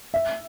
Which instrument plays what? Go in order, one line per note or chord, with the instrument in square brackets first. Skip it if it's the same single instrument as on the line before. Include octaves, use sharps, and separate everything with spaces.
[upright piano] E5